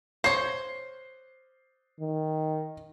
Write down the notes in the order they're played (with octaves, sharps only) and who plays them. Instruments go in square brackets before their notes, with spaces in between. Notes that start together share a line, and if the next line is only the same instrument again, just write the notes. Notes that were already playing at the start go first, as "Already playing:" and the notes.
[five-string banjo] C5 C#5 [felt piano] C7
[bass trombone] D#3